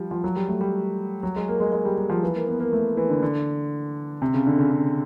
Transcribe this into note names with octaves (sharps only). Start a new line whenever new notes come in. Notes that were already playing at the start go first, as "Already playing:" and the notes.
Already playing: F3 G3
F3
F#3
G3
A3
G3
F#3
G#3
A#3
G#3
G#3
G3
G3
F3
E3
A#3
B3
A#3
A3
E3
D3
D3
C3
C#3
D3
C#3
C#3